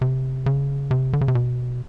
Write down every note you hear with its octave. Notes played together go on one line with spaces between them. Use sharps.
C3
C#3
C3
D3
C#3
C3
B2